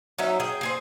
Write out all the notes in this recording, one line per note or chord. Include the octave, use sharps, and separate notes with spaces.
F#3 C#4 D#4 E5
G#4 G5
C4 G#4 C5